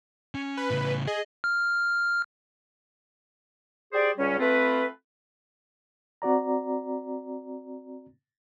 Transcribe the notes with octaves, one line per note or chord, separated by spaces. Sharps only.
C#4
B4
A2 C#3
G#4 D#5
F6
G4 G#4 C5 D5
C#2 G3 C#4
A3 C4 F4 B4
C4 F#4 D5 A#5